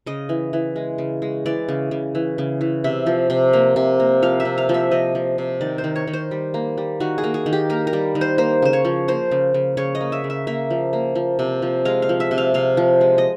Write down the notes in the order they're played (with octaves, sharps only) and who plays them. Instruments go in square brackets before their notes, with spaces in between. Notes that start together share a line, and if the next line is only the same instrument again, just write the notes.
[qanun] C#3 D#5
E3
E3
G#3
C#3
G#3
E3 D5
C#3
C#3
E3
C#3
E3
C3 E5
F3
C3
A#3
C3
A#3
F3 F5
E5
C3
F5
F3
E5
F3 D#5
F3
C3
D#3 D5
C5
D#3
C#5
D#3
C5
G3
A#3
G3
D#3 F#4
G#4
A#3
G#4
D#3
G4
A#3 A#4
A#4
G3
D#3
C5
A#3 C5
C#3 C5
C#5
F3
A#3 C5
C#3
C#3
C#3 C#5
D#5
A#3
E5
C#3
E5
A#3 E5
F3
A#3
F3
C3
F3
G#3 F5
F5
F3
E5
C3
F5
C3 F5
F3
G#3
D#5